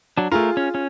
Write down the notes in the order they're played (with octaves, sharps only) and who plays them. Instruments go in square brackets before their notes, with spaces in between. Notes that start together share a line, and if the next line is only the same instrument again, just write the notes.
[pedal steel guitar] F#3 D4
[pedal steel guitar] A3 A#4 [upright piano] F4 G#4
[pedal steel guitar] C#4
C#4